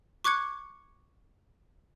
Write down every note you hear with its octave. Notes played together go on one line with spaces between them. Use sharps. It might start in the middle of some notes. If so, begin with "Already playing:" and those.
C#6 D6 F#6 G#6 C#7